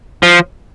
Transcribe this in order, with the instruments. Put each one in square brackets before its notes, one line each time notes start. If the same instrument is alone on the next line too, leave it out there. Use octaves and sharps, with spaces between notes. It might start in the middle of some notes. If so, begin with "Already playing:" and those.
[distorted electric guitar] F3